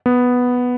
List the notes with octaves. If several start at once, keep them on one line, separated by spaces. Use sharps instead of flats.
B3